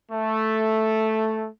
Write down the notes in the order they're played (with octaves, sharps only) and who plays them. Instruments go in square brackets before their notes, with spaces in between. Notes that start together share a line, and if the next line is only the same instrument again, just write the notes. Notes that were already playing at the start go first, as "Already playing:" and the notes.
[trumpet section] A3